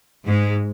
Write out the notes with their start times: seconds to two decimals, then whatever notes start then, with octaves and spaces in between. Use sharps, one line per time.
0.25 G#2 G#3